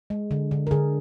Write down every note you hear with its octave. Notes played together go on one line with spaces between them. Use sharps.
G#3
D3
D3
A#4
D3 G#4